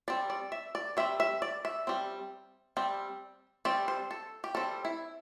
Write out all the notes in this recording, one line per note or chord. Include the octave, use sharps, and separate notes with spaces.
G3 C4 D5
D5
E5
D5
G3 C4 E5
E5
D5
E5
G3 C4
G3 C4
G3 C4 D5
C5
A4
G4
G3 C4 A4
E4